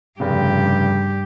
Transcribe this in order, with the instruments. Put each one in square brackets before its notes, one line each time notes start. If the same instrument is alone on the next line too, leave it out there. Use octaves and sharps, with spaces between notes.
[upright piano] F1 C#3 [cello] G2 G4